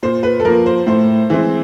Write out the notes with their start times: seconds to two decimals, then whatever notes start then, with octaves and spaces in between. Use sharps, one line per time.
0.03 A#2 C5
0.23 B4
0.40 A4
0.45 F3 A#3 A#4
0.66 C5
0.87 A2 C5
1.30 E3 G#3 C4